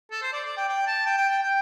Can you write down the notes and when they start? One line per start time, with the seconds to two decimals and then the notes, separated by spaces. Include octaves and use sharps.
0.12 A4
0.23 C5
0.33 D5
0.45 D5
0.57 G5
0.69 G5
0.87 A5
1.06 G5
1.18 G5
1.30 G5
1.42 G5